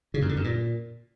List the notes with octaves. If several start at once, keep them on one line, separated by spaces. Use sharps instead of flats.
C#3
F#2
D3
F#2
A#2